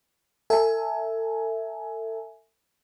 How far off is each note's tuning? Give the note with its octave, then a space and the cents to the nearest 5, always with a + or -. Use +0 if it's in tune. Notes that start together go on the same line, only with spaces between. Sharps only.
A4 +35 E5 +0 G#5 +15